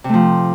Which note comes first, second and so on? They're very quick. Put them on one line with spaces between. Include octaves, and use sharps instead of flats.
C3 A3 F3